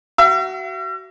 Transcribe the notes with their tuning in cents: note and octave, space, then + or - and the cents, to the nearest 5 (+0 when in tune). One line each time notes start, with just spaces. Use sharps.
F#4 +30 E5 +45